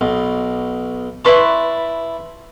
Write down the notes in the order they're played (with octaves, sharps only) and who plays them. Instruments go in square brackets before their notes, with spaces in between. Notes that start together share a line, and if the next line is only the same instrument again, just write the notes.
[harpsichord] B1 B2
[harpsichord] E4 D5 A5 [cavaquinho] B4 C6 C#6